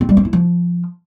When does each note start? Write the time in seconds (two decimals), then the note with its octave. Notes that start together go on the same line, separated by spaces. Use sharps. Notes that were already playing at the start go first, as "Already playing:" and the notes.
0.01 C4
0.09 G3
0.17 C4
0.25 E4
0.33 F3